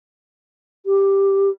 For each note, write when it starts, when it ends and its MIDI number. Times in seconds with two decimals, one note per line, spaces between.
0.86 1.49 67